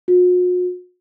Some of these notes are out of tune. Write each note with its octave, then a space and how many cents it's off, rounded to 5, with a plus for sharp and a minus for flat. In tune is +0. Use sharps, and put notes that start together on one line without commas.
F#4 -45